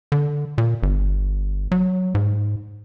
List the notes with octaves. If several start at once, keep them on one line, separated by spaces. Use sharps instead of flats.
D3
A#2
G1
F#3
G#2